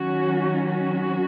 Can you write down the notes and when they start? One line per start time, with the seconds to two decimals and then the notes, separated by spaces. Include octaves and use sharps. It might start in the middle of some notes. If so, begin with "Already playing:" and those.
Already playing: D#3 F#3 C#4 F#4
0.71 F#4